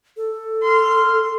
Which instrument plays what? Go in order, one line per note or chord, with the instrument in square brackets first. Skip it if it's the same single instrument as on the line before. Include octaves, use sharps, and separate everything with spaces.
[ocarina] A4
[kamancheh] C6 F6